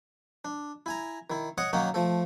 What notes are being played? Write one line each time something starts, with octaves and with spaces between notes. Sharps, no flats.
D4
E4 G#5 A#5
D#3 E4
C#5 D#5 F#5 C#6 D#6
D#3 F#3 A#3 C#4 D#4 F#4
F3 A3 A4